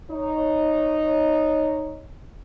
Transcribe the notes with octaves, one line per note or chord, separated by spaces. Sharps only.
D#4 C#5